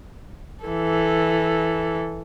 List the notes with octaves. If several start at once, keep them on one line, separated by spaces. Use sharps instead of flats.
E3 A4